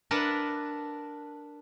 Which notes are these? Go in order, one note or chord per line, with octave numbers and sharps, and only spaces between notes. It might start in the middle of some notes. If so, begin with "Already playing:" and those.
D4 A#4 B4 E5 F#5 A5